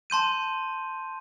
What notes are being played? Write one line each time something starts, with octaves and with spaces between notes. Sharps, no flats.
A5 C6 G6 D#7